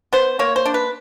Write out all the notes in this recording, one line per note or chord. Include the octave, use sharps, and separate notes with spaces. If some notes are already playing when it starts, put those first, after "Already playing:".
B3 C5
A#3 C#5
C5
D4
B4